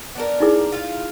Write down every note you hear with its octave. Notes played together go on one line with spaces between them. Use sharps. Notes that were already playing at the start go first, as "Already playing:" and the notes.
B3 D4 A#4
D#4 E4 G#4
F4 F5